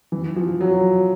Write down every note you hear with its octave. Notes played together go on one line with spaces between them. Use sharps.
E3
F3
F#3